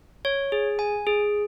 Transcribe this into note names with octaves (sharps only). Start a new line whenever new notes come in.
C#5
G#4
G#5
G#4